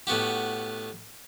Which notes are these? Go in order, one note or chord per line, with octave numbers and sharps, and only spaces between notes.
A2 B3 F#4 G4